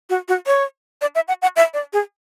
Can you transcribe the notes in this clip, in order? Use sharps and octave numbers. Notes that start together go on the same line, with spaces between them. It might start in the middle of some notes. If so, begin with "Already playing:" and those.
F#4
F#4
C#5
D5
E5
F#5
F#5
E5
D5
G#4